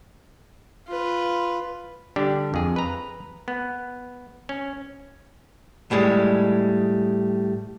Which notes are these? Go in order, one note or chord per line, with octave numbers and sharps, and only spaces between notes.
F4 B4
D3 G3 D4 G4
F2 G#4
B4 A#5
B3
C#4
A2 G3 G#3